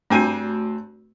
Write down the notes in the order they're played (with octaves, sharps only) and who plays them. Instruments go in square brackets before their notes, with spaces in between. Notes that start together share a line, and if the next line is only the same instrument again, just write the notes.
[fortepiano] G2 C4 G#5 [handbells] A3 F#4